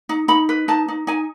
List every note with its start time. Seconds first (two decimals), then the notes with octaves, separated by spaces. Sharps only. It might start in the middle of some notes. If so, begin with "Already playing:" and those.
0.09 D#4
0.28 D#4 B5
0.49 B4
0.68 D#4 A5
0.88 D#4
1.07 D#4 G#5